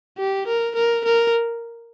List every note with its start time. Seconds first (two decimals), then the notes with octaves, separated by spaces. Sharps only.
0.19 G4
0.47 A#4
0.75 A#4
1.05 A#4